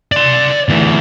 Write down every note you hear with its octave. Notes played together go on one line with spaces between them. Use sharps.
D5 C6
D2 E3